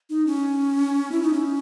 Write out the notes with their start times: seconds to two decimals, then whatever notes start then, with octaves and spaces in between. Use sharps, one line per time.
0.10 D#4
0.27 C#4
1.12 E4
1.23 D#4
1.33 C#4